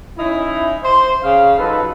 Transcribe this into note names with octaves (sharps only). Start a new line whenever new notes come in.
C#4 D#4 E4
C5
C#3 F5
F3 F#3 D#4 A4 B4